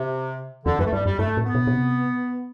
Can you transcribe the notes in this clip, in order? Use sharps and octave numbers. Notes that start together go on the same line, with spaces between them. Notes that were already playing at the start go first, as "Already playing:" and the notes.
Already playing: C3
E2 D3
F#2 E3
A3
G2 G3
F#2 G3
G2 A3
A2
B3
B2
B2
C3